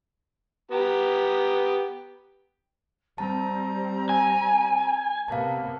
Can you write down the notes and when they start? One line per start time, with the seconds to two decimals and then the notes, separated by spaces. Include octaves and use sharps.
0.71 B3 G4 A#5
3.18 G3 C4 A5 A#5
4.09 G#5
5.28 C3 A#3 B3 F5 A5